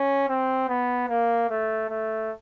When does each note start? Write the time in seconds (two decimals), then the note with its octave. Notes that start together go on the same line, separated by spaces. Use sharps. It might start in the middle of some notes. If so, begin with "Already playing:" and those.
Already playing: C#4
0.29 C4
0.69 B3
1.09 A#3
1.50 A3
1.90 A3